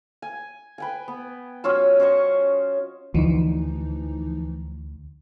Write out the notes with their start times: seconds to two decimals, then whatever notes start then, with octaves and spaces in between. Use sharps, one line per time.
0.22 G#5
0.78 B4 G5 G#5
1.08 B3
1.64 F#3 C#4 F4 E6
2.00 C#4 C5 D#5 C#6
3.14 D2 E3 F3 D#4